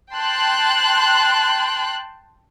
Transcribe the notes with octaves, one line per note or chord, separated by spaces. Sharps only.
G5 A5 C6 F#6